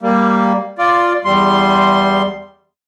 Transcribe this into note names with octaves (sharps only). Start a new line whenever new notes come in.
G3 A#3
F4 D5
E2 G3 C6